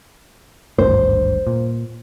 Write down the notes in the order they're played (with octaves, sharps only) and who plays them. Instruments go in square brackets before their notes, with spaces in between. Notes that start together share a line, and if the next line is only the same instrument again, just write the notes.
[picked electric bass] G#1 D2 G2 [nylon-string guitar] C5
[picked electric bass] A#2